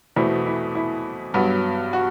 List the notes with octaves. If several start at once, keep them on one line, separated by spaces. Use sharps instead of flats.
E2 B2 A3 C4 E4
E4
E4
G2 F#3 B3
F#4